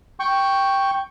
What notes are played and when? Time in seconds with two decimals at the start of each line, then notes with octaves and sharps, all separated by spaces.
0.20 G5 C#6